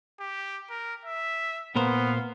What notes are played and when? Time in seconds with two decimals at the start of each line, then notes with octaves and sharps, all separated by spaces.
0.20 G4
0.70 A#4
1.05 E5
1.76 A#2 B3 A#4 C5 F5